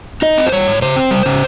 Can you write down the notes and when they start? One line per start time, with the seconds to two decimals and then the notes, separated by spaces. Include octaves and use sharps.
0.22 D#4 D#5
0.38 C4
0.47 C5
0.52 G3 C#5
0.67 G#2
0.82 C#3 C5
0.96 C4
1.11 G3
1.26 C#3